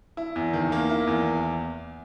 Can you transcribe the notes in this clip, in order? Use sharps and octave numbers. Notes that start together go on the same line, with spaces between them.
E4
E2
D#3
A#3
E4
E2